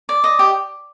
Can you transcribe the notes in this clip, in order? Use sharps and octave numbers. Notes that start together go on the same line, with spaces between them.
D5
D#5
G4